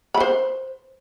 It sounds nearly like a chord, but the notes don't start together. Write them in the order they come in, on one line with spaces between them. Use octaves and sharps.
B5 B4 C5